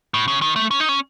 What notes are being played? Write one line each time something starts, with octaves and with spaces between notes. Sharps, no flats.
A2
C#3
D#3
A3
C#4
D#4
C#4